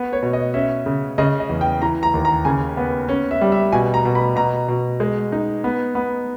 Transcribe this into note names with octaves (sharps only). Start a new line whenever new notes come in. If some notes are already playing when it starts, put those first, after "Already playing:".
Already playing: B3
C#5
B2
D#5
C#4 E5
C#3
C#3 D#5
D#5
E2
G5
E3 A#5
A#5
D#2
A#5
C#3 G#5
B3
C#4
E5
G3
E5
B2 G#5
A#5
B2
B5
B2 A#5
B2
G#3
D#4
B3
B3